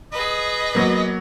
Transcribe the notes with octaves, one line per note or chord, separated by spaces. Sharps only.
G#4 B4 D#5
F#3 A#3 B3